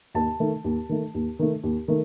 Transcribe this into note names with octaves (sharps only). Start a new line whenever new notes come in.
D#2 A5
D#3 A3
D#2
D#3 A3
D#2
D#3 A3
D#2
D#3 A3